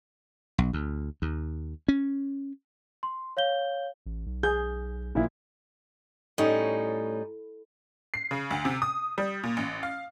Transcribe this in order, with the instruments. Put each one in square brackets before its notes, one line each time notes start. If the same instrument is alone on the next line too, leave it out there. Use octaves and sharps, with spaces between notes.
[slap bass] B1
D2
D#2
C#4
[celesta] C6
C#5 F5 G6 G7
[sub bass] A1
B1
[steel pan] G#4 [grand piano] G6
[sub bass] A1 [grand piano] A#2 F3 E4
[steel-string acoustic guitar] A2 [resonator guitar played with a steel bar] G3 C#4 D#4
[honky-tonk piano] C7
C#3
D2
C3
D#6
G3
A#2
A1
F5